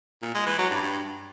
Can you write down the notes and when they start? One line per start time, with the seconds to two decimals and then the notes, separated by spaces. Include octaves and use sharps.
0.22 A#2
0.34 G#3
0.46 E3
0.58 F#3
0.70 G2